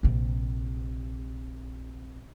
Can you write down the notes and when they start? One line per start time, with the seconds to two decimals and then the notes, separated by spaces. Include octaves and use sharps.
0.03 A#1 C3